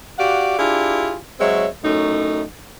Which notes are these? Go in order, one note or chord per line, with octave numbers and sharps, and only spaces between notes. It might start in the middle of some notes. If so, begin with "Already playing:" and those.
F#4 G4 D5 F5 F#5
D4 E4 F4 G4 G#4
F#3 G#3 C4 C#5 E5
F#2 A2 A3 D#4